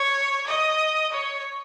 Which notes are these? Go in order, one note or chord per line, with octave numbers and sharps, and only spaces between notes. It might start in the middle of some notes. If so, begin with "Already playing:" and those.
Already playing: C#5
D#5
C#5